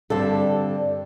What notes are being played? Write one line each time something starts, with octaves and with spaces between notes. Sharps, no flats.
G2 D3 G3 C4 A4